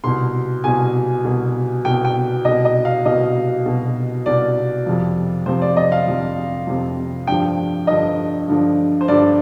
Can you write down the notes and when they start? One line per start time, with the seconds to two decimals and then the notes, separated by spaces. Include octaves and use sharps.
0.04 C2 B2 C6
0.64 C2 B2 G#5
1.25 C2 B2
1.85 C2 B2 G5
2.05 G5
2.45 C2 B2 D#5
2.65 D#5
2.85 F5
3.05 C2 B2 D#5
3.66 C2 B2
4.26 C2 B2 D5
4.86 F2 C3 F3
5.46 F2 C3 F3 C5
5.62 D5
5.76 D#5
5.92 F5
6.06 F2 C3 F3
6.67 F2 C3 F3
7.27 G2 D3 F3 G5
7.87 G2 D3 F3 D#5
8.48 G2 D3 F3
9.01 C5
9.08 G2 D3 F3 D5